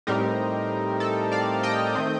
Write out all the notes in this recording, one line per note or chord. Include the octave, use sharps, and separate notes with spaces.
A2 G3 C4 D#4 G4 A#4
A4
D5 F5
D#5 G5
D#3 A3 C4